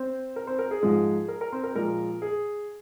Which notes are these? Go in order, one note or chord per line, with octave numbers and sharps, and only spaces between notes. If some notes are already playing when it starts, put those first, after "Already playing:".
Already playing: C4 C5
A#4
C4 C5
A#4
G#4
G#2 F3 G#3
A#4
A#4
C4 C5
A#4
A#2 F3 G#3 A#4
G#4